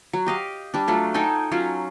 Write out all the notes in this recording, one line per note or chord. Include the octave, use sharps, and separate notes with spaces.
F#3
G4 D#5 F5
G3 D4
F#3 A3 F4
D#4 A4 G5 G#5
F#3 C#4 F4